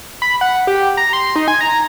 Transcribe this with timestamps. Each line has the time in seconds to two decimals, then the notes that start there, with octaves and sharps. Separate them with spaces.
0.22 B5
0.41 F#5
0.67 G4
0.97 A#5
1.13 C6
1.36 D#4
1.48 G#5
1.61 A#5